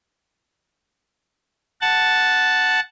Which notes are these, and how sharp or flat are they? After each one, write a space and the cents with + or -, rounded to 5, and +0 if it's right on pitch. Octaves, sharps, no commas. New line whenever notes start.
F#5 +0 A5 +0